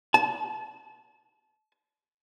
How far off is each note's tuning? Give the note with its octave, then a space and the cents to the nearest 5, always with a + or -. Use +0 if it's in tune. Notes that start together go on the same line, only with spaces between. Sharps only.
A5 -30